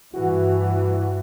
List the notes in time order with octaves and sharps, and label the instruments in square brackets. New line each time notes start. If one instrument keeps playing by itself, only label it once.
[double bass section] G2 E3 [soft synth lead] F#4